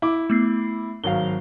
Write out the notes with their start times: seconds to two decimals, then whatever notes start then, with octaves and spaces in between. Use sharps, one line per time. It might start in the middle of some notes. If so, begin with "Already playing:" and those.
0.02 E4 D6
0.30 A3 B3 C7
1.04 G#1 F#3 F5 G7